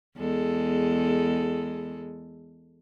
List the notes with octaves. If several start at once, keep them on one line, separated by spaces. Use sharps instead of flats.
E2 G#3 A4